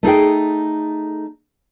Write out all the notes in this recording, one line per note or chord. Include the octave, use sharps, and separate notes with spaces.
A3 D#4 G#4 G5